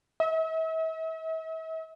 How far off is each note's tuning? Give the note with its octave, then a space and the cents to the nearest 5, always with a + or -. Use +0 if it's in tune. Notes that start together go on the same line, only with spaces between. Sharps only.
E5 -40